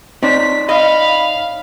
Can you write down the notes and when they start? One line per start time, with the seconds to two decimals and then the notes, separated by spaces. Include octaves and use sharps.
0.23 C4 D#4 C#5 D5 B6
0.69 D#5 F5 B5